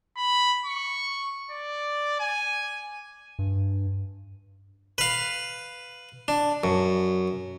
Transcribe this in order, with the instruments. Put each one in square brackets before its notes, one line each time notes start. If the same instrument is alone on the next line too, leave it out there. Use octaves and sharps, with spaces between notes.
[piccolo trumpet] B5
C#6
D5
G#5
[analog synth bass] G2
[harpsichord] B4 F5
D4
F#2